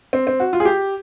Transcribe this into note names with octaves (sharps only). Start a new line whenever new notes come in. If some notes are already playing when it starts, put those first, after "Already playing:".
C4
C4
F#4
F4
G#4
G4